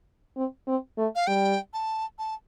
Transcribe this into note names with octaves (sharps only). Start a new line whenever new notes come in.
C4
C4
A3
F5
G3 G5
A5
A5